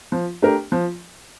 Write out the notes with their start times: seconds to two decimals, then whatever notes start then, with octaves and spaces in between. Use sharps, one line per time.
0.12 F3
0.42 A3 D4 G4 A#4
0.72 F3